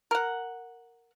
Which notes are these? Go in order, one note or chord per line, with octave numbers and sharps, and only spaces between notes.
A#4 F#5